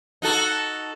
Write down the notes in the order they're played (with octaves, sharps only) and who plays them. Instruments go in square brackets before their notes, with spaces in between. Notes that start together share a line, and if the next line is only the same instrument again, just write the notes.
[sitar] D#4 F#4 A4